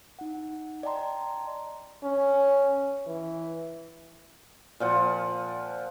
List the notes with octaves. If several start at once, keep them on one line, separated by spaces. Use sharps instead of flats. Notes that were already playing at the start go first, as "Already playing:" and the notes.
D#4 F#5
D5 D#5 G5 A5 A#5 C6
C#4
E3
A#2 F3 F#5